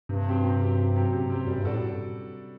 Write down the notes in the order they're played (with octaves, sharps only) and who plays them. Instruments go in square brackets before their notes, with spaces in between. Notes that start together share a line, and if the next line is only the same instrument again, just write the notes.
[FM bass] G2 [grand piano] C3
[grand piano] F#3 C4 G4
C3
F#3 C4 G4
C3
F#3 C4 G4
C3
F#3 C4 G4
[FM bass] F#2 [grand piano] G3
[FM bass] G2
[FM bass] A2 [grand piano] D4 F#4 A4